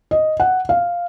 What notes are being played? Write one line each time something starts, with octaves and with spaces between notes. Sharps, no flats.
D#5
F#5
F5